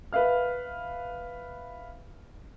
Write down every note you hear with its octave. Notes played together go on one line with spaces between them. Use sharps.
B4 E5 F5 F6